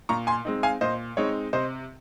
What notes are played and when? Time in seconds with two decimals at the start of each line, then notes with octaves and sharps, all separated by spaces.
0.09 A#2 A#5 C#6
0.27 G#5 C6
0.45 G#3 C4 D#4
0.63 F5 G#5
0.81 A#2 C5 D#5
1.17 G#3 C4 D#4 C#5
1.53 C3 C5 D#5